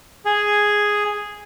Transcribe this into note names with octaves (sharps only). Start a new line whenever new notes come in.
G#4